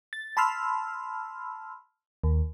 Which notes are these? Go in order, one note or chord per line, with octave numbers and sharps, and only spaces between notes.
A6
A5 B5 C6 E6 F6
D#2